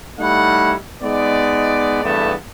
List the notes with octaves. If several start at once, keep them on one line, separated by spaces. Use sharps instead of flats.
G3 A3 D#4 E4 F#5
G#3 B3 D#4 D5
E2 G2 A3 B3 A5